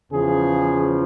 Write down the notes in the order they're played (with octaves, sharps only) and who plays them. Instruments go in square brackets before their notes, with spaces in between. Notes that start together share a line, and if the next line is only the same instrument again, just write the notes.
[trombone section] E2 C#3 F3 G#4